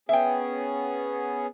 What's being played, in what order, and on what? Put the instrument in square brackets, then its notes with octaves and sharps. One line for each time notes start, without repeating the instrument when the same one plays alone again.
[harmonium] B3 C#4 G#4 [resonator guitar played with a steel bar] E5 G5